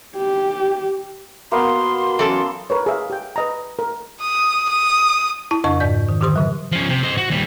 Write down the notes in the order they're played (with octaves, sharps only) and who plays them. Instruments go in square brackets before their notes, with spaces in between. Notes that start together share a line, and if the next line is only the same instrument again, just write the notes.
[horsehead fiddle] G4
[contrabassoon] B2 [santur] A#3 B3 F5 [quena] C6
[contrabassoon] F#2 [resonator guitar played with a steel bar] E3 A4
[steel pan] A#4 B4 C#5
G#4 E5 F5
G4 G5
B4 D#5 A#5
A#4
[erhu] D#6
D#6
[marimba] E4 A5
F2 C#3 D4 D#5 A5 C#6
G#2 D5 G6
D#3
D3 D#3 G4 C6 D#6
C#3 F#3
[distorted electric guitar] F3 C#4
C3
C5 D#5
F#4
D#2 G3